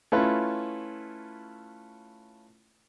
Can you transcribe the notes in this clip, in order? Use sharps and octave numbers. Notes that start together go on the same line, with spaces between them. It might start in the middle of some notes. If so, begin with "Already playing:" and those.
A3 C#4 E4 F4 B4